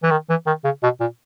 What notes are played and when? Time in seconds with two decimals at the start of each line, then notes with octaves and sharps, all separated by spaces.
0.03 E3
0.11 D#3
0.29 E3
0.47 D#3
0.64 C#3
0.83 B2
1.00 A#2